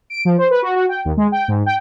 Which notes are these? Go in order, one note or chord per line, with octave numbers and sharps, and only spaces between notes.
D7
F3
C5
B4
F#4
F#4
G5
D#2
G#3
G5
G#2
G5